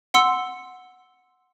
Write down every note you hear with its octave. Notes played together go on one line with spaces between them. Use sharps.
F#5 C6 E6 C#7